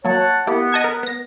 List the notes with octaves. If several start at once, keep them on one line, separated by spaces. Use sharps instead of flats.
F#3 A#3 C#5 F#5 A5
A#3 B3 E4 G4
D#5 A5 G#6
A#4
B3 A#6